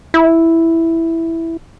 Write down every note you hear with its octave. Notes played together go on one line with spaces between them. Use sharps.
E4